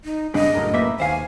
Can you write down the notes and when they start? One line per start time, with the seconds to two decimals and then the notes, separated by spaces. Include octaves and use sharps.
0.05 D#4
0.34 G2 C#3 D4 D#5
0.55 F#2 A2 A#4
0.74 A#3 B4 E5
1.00 D#2 C5 F5 G#5